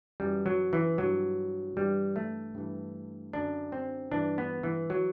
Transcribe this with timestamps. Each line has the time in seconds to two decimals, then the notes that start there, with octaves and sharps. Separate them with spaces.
0.20 F#2 E3 G3
0.46 F#3
0.73 E3
0.98 G2 E3 F#3
1.76 G2 E3 G3
2.16 A3
2.55 G2 E3
3.33 F#2 D3 D4
3.72 C4
4.12 G2 E3 D4
4.38 B3
4.63 E3
4.90 E3 F#3